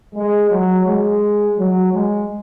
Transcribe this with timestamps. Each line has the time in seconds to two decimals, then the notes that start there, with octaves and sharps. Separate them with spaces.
0.15 G#3
0.51 F#3
0.86 G#3
1.59 F#3
1.94 G#3